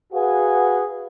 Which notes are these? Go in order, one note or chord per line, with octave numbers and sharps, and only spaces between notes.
F#4 G#4 B4 F5 F#5 G#5